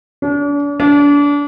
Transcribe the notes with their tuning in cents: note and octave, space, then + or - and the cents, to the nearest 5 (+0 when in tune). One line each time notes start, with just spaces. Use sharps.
D4 -40
D4 -30